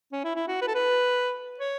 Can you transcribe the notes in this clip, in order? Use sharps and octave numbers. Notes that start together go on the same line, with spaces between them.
C#4
E4
E4
F#4
B4
A4
B4
C#5